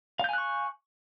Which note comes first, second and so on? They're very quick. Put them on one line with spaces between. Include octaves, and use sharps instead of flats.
F5 G6 G#5 F#6 C#6